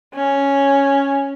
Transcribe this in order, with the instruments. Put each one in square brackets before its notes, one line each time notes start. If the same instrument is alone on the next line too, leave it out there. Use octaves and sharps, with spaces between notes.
[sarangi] C#4